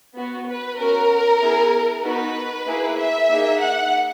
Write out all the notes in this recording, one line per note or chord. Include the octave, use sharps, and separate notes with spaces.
B3 F#4
B4
C#4 F#4 A#4
B3 E4 G#4
B3 D#4 F#4 B4
A#3 E4 G#4
E5
A#3 D#4 G#4
F#5